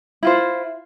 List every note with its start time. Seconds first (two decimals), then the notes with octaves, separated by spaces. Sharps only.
0.23 E4 F4 C5